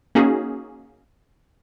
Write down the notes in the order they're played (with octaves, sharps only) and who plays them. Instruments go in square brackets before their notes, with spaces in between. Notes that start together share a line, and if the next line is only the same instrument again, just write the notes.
[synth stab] A#3 C#4 D#4 F#4 G#4